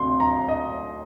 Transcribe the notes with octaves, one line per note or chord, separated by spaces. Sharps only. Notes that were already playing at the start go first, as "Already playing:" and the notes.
Already playing: D2 C3 C6
A#5
D#5